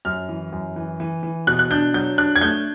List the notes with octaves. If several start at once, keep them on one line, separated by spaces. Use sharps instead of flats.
F#2 F6
E3
F#2
E3
E3
E3
B2 F#6
F#6
D4 G6
F#3 G6
D4 F#6
G#6
A3 G6